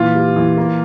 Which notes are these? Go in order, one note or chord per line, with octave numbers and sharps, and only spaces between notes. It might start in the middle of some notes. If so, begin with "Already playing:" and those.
Already playing: A#2 E3 F4
G3
E3
A#3